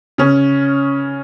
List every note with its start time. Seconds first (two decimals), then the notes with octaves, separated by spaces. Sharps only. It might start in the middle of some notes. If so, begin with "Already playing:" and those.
0.18 C#3 C#4